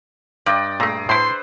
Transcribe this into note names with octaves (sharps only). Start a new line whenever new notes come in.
G2 D5 D#5 G5
A#2 A3 G#4 E5 A#5
A2 E4 B4 C5 C6